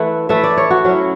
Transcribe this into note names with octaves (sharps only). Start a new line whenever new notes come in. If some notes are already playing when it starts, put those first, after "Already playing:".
Already playing: E3 A3 E4 F#5
E3 A3 E4 E5
D5
C#5
F#4
F#3 C#4 E4